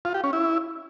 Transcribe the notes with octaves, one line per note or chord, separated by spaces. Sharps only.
F4
G4
C#4
E4